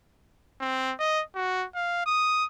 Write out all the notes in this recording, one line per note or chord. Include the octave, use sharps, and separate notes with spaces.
C4
D#5
F#4
F5
D#6